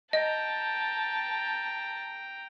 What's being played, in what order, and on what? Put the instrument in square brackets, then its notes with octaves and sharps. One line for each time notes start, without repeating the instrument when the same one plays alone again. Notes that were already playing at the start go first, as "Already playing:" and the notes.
[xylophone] D#5 [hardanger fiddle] G5 A#5 [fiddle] A5